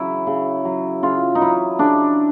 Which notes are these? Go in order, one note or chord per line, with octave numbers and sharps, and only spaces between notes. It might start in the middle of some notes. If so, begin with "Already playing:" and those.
Already playing: C#3 F#3 E4
C#3
F#3
C#3 F4
D#4
F#3 E4
C#3 D4